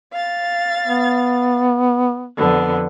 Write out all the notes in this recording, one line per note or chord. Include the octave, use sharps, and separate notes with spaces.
F5 A6
B3
F2 D3 B3